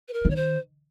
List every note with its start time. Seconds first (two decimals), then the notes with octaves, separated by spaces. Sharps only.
0.08 B4
0.13 A#4
0.25 D#3
0.30 C#5
0.36 C5